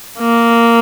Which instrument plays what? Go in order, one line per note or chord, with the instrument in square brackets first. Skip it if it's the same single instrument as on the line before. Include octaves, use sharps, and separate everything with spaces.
[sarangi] A#3